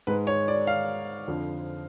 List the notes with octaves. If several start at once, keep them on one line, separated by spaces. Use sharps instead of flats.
G#2 G#3 B4
C#5
D5
F5
F2 D3 F3